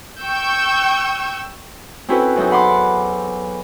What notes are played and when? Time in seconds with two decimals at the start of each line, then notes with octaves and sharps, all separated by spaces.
0.21 G5 C#6 E6 G6
2.09 C4 C#4 E4 F#4 A4 B4
2.36 E2 F#3 C4 D#4
2.51 F#5 B5 C6 D6